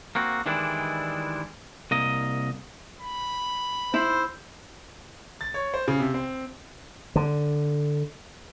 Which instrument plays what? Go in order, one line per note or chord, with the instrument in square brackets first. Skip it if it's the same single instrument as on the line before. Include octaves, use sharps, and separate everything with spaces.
[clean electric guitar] A#3 C4 F#4
D#3 E3 G3 G#3 D4 E4
C2 A#3 D#5
[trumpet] B5
[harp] E4 [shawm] C5
[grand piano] A6
C#5
C5
C#3
C3
C4
[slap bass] D3